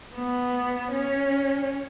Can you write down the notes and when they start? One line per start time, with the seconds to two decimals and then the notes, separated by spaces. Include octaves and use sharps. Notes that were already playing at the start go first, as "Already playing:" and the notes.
0.16 B3
0.92 C#4